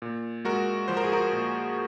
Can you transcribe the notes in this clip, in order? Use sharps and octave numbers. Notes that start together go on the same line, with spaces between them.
A#2
G#3 F#4 A#4
F3 C5
A#4
G#4
F#4 A#4
A#2